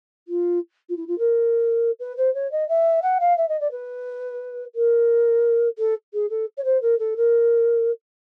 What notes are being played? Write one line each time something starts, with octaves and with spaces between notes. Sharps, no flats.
F4
F4
E4
F4
A#4
B4
C5
C#5
D#5
E5
F#5
F5
E5
D#5
D5
B4
A#4
A4
G#4
A4
C#5
C5
A#4
A4
A#4